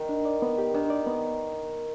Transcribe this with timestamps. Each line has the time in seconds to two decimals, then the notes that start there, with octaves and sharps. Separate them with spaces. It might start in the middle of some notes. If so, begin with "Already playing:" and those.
Already playing: D#3
0.09 D4
0.25 D5
0.42 B3
0.58 G4
0.74 D#3 D4
0.90 D5
1.07 B3